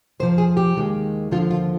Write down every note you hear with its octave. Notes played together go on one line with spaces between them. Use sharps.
F2 C3 F3 C5
G#4
G4
D#2 D#3 G#3
D#2 D3 F3 F4
F4